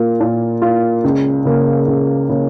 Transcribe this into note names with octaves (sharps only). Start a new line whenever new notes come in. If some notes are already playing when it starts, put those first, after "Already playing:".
Already playing: A#2 A#3 F4
A#2
A#3 F4
C#2
C#3 A#3
C#2
C#3 A#3